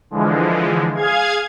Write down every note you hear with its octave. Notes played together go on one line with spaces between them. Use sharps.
D3 E3 F3 G#3
G#4 F5 G#6